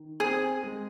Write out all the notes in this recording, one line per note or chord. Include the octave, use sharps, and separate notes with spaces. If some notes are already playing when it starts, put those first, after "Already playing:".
Already playing: D#3
C4 G#4
G#3